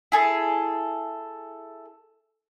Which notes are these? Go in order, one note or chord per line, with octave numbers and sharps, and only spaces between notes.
E4 G#4 A4